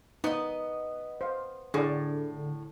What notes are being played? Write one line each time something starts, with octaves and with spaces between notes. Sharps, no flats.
B3 D#4 D#5
C5 F5
A2 D3 G#4 D5